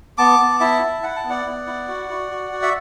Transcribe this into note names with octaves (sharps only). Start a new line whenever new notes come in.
B3 A5 D6
B3
E4 E5 A5
E4
E4 F#5
A5
B3
D5 F#5
B3
E4
F#4
F#4
F#4
F#4
E5